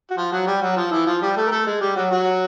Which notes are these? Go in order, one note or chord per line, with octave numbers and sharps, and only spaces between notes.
F#4
F3 F4
F#3 F#4
G3 G4
F#3 F#4
F3 F4
E3 E4
F3 F4
G3 G4
A3 A4
A#4
A3 A4
G#3 G#4
G3 G4
F#3 F#4
F#3 F#4